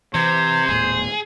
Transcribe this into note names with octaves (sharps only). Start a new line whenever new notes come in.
C3 E3 C5 G#6
D#1 A2 B3 G#4